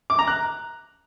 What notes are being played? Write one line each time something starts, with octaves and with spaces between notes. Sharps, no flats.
D6
A#5
F#6